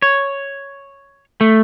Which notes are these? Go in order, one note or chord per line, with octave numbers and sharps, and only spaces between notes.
C#5
A3